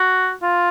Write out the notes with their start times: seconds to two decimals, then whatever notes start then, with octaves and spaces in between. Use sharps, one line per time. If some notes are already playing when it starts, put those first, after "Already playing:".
Already playing: F#4
0.42 F4